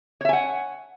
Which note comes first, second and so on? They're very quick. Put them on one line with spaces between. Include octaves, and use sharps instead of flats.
C#5 E5 G#5 F#5